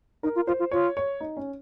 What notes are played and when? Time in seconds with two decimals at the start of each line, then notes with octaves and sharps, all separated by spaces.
0.23 D#4 A#4
0.35 F4
0.47 F4 C5
0.59 F4
0.71 F4 C#5
0.97 C#5
1.21 D#4
1.37 C#4